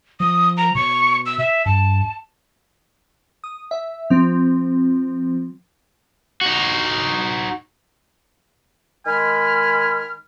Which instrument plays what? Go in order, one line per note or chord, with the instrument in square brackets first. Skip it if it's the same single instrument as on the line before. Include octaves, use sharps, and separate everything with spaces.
[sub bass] F3 [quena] D#6
[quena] A#5
[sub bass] B2 [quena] C#6
[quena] E6
E5
[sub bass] G2 [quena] A5
[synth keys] D#6
E5
F3 C4
[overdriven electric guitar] D#4 F#4
[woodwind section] D#3 G#3 G#5 B5 F6